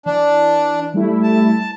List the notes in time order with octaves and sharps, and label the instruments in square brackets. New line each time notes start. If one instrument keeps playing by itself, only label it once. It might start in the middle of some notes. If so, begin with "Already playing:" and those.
[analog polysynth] E3 [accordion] D4
[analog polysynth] G3 A3 E4
[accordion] A5